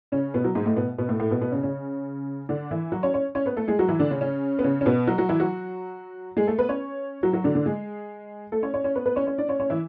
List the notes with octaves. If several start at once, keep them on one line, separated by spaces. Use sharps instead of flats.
C#3 C#4
B2 B3
F#3
G#2 G#3
A2 A3
B2 B3
B2 B3
A2 A3
A2 A3
B2 B3
B2 B3
C#3 C#4
C#3 C#4
D3 D4
E3 E4
F#3 F#4
C#4 C#5
C#4 C#5
C#4 C#5
B3 B4
A3 A4
G#3 G#4
F#3 F#4
E3 E4
D3 D4
C#3 C#4
C#3 C#4
B3
C#3 C#4
C#4
B2 B3
F#3 F#4
F#3 F#4
E3 E4
F#3 F#4
G#3 G#4
A3 A4
B3 B4
C#4 C#5
F#3 F#4
F#3 F#4
D3 D4
D3 D4
G#3 G#4
A3 A4
C#4 C#5
C#4 C#5
C#4 C#5
B3 B4
B3 B4
C#4 C#5
C#4 C#5
D4 D5
C#4 C#5
C#4 C#5
E3 E4